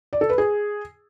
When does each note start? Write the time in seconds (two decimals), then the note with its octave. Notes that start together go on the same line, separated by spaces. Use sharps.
0.13 D5
0.21 A4
0.30 B4
0.38 G#4